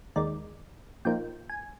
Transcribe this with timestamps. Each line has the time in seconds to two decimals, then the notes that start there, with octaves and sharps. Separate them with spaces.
0.16 D#2 D#3 G#3 D#4 D5
1.05 A#2 F3 A#3 D#4 G5
1.49 G#5